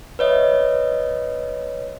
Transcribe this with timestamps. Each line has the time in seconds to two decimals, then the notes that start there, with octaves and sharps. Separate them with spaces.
0.19 B4 C#5 D#5 E5